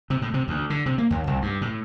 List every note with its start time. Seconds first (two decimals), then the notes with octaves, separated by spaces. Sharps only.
0.10 C3
0.22 A2
0.34 C3
0.48 D2
0.70 D3
0.86 C3
0.98 A#3
1.11 D#2
1.27 C2
1.42 G2
1.61 A2